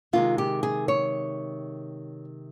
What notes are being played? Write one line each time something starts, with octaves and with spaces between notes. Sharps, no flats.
C3 D#3 G#3 F4
G4
G#4
C#5